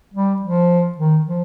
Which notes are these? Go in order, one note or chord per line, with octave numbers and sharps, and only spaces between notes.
G3
F3
D#3
F3